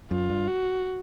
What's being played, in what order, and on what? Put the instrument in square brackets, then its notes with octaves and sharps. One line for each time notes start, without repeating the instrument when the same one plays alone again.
[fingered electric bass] F#2 [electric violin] F4
[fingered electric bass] G2
[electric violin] F#4